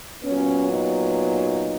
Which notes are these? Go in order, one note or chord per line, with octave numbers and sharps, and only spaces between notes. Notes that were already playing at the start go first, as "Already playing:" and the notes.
A#2 F#3 B3 C#4
D#4